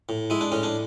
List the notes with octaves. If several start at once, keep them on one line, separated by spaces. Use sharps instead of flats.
A2
G#3 E4
D4
A2 C#4
D4